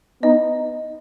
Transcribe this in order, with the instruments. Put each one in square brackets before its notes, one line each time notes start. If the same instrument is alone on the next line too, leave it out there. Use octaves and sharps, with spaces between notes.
[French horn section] B3 D#4 [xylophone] D#5